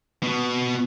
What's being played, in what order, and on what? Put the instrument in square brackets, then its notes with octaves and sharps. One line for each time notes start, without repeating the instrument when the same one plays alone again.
[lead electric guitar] B2 B3